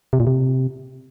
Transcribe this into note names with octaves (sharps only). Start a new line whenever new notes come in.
C3
A#2
C3